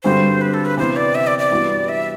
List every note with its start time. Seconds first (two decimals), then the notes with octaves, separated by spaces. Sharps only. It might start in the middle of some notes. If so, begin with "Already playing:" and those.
0.04 G2 D3 G3 C4 F#4 C5
0.41 B4
0.54 A4
0.65 B4
0.78 C3 E3 B3 C5
0.96 D5
1.15 E5
1.27 D5
1.39 D5
1.51 G2 E3 G3 B3 F#4
1.89 E5